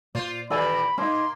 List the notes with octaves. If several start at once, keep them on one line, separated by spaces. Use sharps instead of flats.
A#2 F4 C5 D5
D#3 E3 G3 A4 D5 G#5 B5
A#3 C#4 D#4 C6